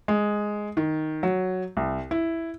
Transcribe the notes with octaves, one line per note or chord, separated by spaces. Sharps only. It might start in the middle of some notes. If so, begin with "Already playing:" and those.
G#3
D#3
F#3
C2
E4